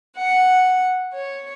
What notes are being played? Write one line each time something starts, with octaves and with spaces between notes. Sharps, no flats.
F#5
C#5